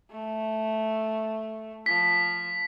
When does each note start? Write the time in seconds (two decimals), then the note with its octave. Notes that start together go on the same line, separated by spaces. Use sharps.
0.11 A3
1.86 F3 B6